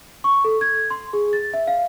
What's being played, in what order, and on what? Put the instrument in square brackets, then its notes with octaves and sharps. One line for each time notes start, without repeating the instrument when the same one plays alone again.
[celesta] C#6
A4
G#6
C6
G#4
A6
E5
F5